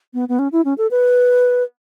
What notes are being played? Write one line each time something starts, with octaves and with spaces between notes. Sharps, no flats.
B3
B3
C#4
E4
C#4
A4
B4